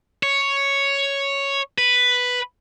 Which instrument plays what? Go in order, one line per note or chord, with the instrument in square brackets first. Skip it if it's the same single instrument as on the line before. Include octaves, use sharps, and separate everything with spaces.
[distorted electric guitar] C#5
B4